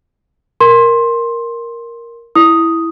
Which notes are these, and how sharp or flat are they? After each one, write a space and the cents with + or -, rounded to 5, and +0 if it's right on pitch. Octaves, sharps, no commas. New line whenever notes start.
A#4 +0 C6 +15
E4 +0 D#6 +0